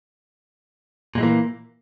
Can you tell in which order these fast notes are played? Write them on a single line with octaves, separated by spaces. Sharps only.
A#2 G#3 E3 A#3